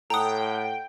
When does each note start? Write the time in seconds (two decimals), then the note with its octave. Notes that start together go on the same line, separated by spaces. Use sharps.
0.10 A2 A4 F#5 G5 A#5 D#6